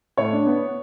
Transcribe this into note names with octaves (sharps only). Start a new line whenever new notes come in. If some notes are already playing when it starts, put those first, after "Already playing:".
A2 C#5
D4
B3